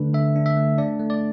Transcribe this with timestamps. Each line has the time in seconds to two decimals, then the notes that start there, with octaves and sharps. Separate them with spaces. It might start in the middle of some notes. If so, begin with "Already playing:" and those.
Already playing: D3 A3 D4 B4
0.13 D3 E5
0.36 D4
0.46 E5
0.57 A3
0.78 D4 D5
0.99 A3
1.10 D5